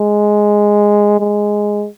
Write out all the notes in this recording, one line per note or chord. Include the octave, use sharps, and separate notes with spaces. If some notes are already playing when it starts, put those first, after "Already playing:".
Already playing: G#3
G#3